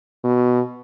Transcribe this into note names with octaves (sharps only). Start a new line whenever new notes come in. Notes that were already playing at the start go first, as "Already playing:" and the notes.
B2